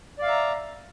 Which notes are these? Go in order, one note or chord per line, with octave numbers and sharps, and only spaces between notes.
D5 E5 F5 A#5